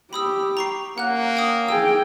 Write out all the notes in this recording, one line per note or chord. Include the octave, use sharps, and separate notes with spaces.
G4 B5 D#6 E6
A#5 C#6 C7
A#3 C#4 F#5 F#6
G5 D#6
G#4 G5 E6